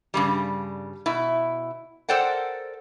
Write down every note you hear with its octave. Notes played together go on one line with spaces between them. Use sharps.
G2 C#3 G3
B2 E4
A4 A#4 C5 D5 F#5 G5